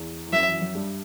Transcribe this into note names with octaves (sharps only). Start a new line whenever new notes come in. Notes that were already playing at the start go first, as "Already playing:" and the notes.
Already playing: E2
E3
F#2 F#3 E5
E3
F#3
G2 G3